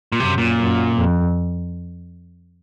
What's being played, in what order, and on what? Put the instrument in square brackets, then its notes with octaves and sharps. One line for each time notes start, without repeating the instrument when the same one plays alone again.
[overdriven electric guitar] A#2
[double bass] F#2 [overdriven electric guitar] C3
[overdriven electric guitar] A#2
[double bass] F#2
F2